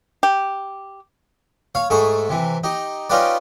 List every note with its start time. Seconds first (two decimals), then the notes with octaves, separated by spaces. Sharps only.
0.23 G4
1.75 C#5 F5
1.90 G#2 A3 G#4 C#6
2.29 C3 E3
2.64 D#4 G4
3.10 C#4 D#4 F4 G4 B4 D5